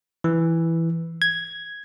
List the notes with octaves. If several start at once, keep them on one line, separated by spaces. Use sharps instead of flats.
E3
G#6